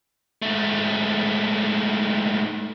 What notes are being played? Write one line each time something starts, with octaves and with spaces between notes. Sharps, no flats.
G#2 A3